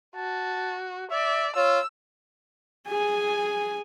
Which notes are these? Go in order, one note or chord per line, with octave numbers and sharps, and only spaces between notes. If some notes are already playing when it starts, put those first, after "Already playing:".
F#4 A5
D5 E5
F4 C#5 E6
G#4 G#5